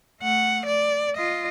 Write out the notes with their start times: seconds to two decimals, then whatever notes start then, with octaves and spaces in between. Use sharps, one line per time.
0.21 A3 F#5
0.66 D5
1.17 F4 D#5